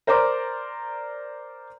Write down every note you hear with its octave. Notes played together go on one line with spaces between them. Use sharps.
A#4 C5 D5 A#5 D6